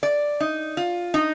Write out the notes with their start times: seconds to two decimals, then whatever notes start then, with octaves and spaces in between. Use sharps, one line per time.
0.03 D5
0.40 D#4
0.77 F4
1.14 D#4